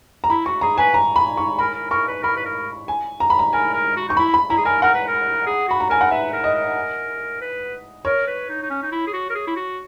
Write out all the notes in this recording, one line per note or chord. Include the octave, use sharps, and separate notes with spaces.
A#5
E4 B5
F#4 C#6
G#4 A#5
B4 G#5
A#5
B5
C#6
A#4 B5
A#4
A#4 C#6
B4
A#4 B5
B4
A#4
G#5
A#5
B5
A#5
A#4 G#5
A#4
F#4
D#4 C#6
E4 B5
B5
E4 A#5
G#4
A#4 G#5
A#4 F#5
B4
A#4
G#4
F#4 B5
A#5
A#4 G#5
F#5
B4 E5
A#4
D#5
A#4
B4
A#4 C#5
B4
D#4
D#4
C#4
D#4
E4
G#4
F#4
A#4
G#4
E4
F#4